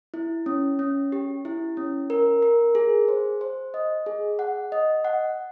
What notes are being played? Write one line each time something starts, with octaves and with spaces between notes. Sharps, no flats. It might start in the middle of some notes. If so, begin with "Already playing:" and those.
E4
C#4
C#4
G4
E4
C#4
A#4
A#4
G#4
C5
C5
D#5
G#4
F#5
D#5
F#5